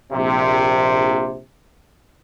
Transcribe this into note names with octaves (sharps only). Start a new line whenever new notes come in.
A#1 C3